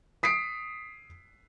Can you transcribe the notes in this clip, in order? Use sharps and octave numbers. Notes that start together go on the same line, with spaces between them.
D#6 B6 C7 D7